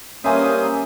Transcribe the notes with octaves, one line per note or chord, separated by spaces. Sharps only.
G2 A#3 C#4 C5 E5 G#5 D#6